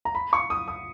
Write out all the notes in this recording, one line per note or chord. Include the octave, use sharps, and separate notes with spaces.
A#5
B5
C#6
D#6
D#6